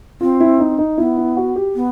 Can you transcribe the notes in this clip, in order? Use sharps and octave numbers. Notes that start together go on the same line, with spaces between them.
C4 F4
E4
D#4
D#4
B3 E4
E4
F#4
G4
B3